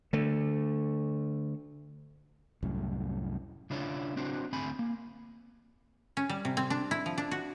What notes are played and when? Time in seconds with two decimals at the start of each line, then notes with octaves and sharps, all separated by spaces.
0.13 D3 A3
2.63 C2 F#2 A2
3.70 C#3 D4 E4 F4 C#5
4.17 C4 D4 F#4 C5
4.52 D2 C4 E4 G#5 B5
4.79 A#3
6.17 C#4
6.29 G3
6.45 C3
6.57 C4
6.70 D4
6.91 E4
7.06 F3
7.18 D4
7.31 F#4